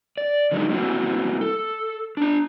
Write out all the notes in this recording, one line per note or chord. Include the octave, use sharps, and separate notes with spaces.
D5
D3 F3 F#3 G#3 D#4
G3 A#3 C4 E4 F#4
A4
D4 A#5